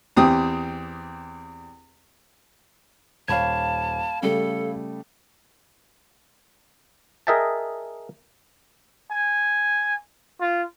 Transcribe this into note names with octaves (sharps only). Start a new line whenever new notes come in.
E2 C4 G4 D#6
D#1 C#5 F5 A5 B5 G#6
C#3 G3 A3 A4
G#4 A#4 D#5 E5 G5 A5
G#5
F4